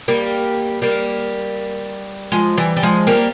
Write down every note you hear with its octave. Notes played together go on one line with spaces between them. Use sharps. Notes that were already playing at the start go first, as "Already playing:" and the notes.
G3 A#3
G3 A#3
F3 G#3
E3 G3
G3
F3 G#3
G3 A#3